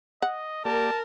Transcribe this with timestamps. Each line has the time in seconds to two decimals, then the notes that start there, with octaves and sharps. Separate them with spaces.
0.22 D#5 F#5
0.65 A#3 G4 A#4 D5 A5